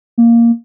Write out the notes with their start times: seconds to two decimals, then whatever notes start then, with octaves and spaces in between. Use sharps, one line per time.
0.18 A#3